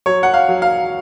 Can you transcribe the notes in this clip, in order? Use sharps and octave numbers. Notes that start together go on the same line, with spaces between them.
F#3 C#5
F#5
F5
F#3
F5